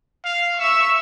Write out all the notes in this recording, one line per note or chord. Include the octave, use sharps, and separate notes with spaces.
F5
E5 C#6 E6